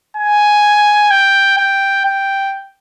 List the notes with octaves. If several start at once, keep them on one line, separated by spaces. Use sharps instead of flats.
G#5
G5
G5
G5